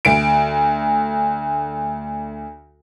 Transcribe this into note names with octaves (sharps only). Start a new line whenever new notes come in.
D2 D7